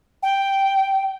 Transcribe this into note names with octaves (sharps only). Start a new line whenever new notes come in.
G5